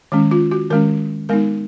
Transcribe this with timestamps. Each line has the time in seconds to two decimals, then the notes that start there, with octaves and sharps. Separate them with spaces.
0.12 D#3 G#3 C#4
0.31 F4
0.51 F#4
0.70 D#3 G#3 C#4 A#4
1.29 G#3 B3 D#4 A#4